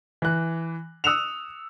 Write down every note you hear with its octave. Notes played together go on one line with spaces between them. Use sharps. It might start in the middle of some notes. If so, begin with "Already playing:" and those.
E3 F#6
D#6 E6 F#6 C#7 E7 F7